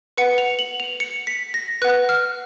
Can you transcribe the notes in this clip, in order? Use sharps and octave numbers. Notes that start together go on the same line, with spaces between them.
B4 F#5 C#7
F7
F#7
F7
C#7
B6
A#6
B4 F#5 F#6
F6